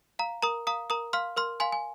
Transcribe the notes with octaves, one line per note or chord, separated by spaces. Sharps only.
F5 A#5
A#4 A#5 D#6
F5 A#5 D#6
A#4 A#5 D#6
F5 C6 F6
A#4 C6 F6
F5 G#5 C6
G#5